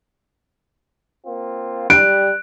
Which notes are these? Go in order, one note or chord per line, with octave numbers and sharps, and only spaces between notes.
A#3 C4 F4
G3 F#6 D7